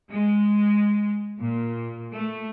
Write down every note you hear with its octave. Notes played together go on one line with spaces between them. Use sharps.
G#3
A#2
A3